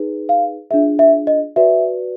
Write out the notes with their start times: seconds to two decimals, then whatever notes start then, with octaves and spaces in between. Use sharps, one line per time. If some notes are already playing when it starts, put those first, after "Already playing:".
Already playing: D#4 G#4 B4
0.29 F5
0.71 D4 F4 G#4 E5
0.99 E5
1.27 D#5
1.56 F#4 B4 D5 E5